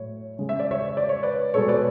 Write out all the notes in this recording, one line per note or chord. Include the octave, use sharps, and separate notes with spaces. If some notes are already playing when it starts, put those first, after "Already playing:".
Already playing: A2 F#3 A3 C#5
C#3 G#3
E5
D5
C#5 E5
D5
C#5
B4 D5
B2 G#3 A4 C#5
B4 D5